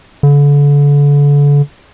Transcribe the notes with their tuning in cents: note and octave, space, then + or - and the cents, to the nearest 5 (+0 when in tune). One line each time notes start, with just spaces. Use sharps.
D3 -35